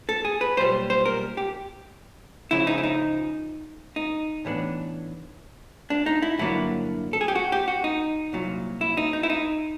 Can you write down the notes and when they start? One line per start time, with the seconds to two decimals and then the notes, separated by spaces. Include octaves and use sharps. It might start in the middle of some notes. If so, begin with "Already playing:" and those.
0.09 A4
0.25 G#4
0.41 B4
0.57 B1 A#2 G3 C5
0.90 C5
1.05 A#4
1.37 G4
2.51 C#2 C#3 F3 E4
2.67 D#4
2.78 E4
2.83 D#4
3.96 D#4
4.45 A2 E3 G3 B3 D4
5.90 D4
6.06 D#4
6.22 E4
6.39 G2 D3 F#3 A#3 D4 E4
7.13 A4
7.21 G#4
7.28 G4
7.35 F#4
7.52 G4
7.68 F#4
7.84 D#4
8.33 C2 A#2 F#3
8.81 E4
8.97 D#4
9.13 D#4
9.23 E4
9.30 D#4